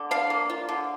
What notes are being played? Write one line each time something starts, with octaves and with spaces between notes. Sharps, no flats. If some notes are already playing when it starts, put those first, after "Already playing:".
Already playing: D3
D4 F5
A#3
F4
D3